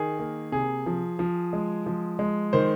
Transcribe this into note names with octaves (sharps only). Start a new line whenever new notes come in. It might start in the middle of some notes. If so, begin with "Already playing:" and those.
Already playing: D#3 G#4
A#3
C3 G#4
F3
F3
G#3
F3
G#3
D#3 C5